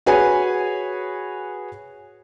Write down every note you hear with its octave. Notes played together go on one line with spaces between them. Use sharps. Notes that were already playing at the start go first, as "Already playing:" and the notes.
F#4 G#4 B4 C#5 G#5